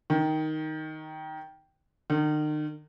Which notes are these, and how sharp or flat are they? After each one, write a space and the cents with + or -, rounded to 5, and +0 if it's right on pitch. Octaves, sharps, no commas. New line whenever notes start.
D#3 +5
D#3 -40